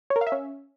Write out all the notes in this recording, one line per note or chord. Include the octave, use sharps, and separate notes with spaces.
C#5
A#4
F5
E5
C#4